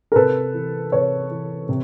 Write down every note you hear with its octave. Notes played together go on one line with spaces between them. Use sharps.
A#4
C3 A4 B4
E3
C3 B4 C#5
E3
C3